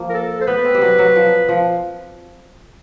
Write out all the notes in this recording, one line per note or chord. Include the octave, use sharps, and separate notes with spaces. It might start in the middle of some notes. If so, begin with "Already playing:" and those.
Already playing: F3 A#3
A#4
A4
C5
B3 B4
C4
G3
F#3
F#3
F3
F3